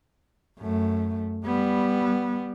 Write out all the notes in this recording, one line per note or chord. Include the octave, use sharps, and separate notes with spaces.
F#2 A3
G3 B3